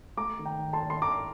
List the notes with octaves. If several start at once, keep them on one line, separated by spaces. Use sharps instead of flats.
A3 A#5 D6
D#3
G5 A#5
D#3
A5 C6
D#2
C6
D#2 A#5 D6